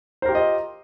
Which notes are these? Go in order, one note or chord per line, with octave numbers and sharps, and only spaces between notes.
F4 G4 A#4 C5 D#5